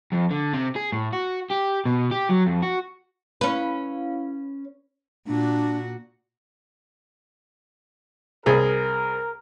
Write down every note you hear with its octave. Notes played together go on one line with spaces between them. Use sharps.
F2
D3
C3
G#4
A2
F#4
G4
B2
G4
F#3
F2
F#4
C#4 E4 B4 F5
A#2 D4 F#4
C2 G#4 A#4